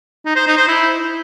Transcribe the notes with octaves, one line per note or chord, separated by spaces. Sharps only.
D#4
C5
D#4
C5
E4